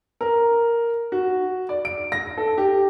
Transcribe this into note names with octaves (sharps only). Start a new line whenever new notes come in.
A#4
F#4
D5
D7
A#6
A4
G4